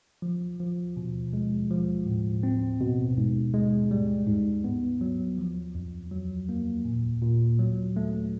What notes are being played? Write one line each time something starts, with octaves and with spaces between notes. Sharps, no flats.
F3
F3
B2
G#3
F3
A2
C4
B2
G#2
G#3
G3
G#2
B3
F#3
F3
F2
F#3
A#3
A#2
A#2
F#3
A3